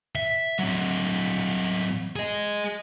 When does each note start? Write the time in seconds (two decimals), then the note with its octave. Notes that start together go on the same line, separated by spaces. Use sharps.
0.15 E5
0.59 F#3 C4
2.16 G#4 D#5